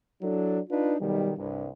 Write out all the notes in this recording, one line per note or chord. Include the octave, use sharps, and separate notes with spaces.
F#3 D4 E4 A4
D4 D#4 F4 B4
B1 D#3 G3
C2 G2